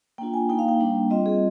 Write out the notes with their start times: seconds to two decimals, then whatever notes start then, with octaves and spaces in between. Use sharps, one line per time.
0.18 A#3 D4 F4 G5
0.34 G#5
0.49 A#3 D#4 G5
0.59 F5
0.69 G5
0.80 G3 A#3 D4
1.10 G3 C4 F4 D#5
1.26 G#4